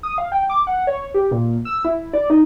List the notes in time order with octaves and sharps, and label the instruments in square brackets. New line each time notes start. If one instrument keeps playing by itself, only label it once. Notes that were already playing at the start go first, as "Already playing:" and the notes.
[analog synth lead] D#6
F5
G5
D6
F#5
C#5
G4
A#2
E6
E4
D5
D#4